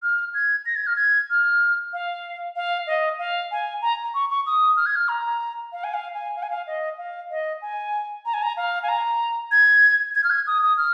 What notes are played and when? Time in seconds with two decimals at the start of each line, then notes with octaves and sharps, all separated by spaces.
0.03 F6
0.34 G#6
0.66 A#6
0.76 G#6
0.87 F6
0.96 G#6
1.30 F6
1.93 F5
2.56 F5
2.87 D#5
3.19 F5
3.51 G#5
3.82 A#5
4.14 C#6
4.30 C#6
4.46 D#6
4.77 F6
4.86 G#6
4.96 F6
5.08 A#5
5.72 F5
5.84 G#5
5.94 F5
6.14 G#5
6.36 F5
6.43 G#5
6.50 F5
6.67 D#5
6.98 F5
7.31 D#5
7.62 G#5
8.26 A#5
8.34 G#5
8.43 A#5
8.57 F5
8.83 G#5
8.89 A#5
9.52 G#6
10.15 G#6
10.24 F6
10.30 G#6
10.47 D#6
10.62 D#6
10.77 F6